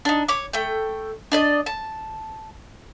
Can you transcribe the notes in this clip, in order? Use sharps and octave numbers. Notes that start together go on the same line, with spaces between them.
D4 D#4
C#5 D6
A3 G5
D4 D5 D#5
A5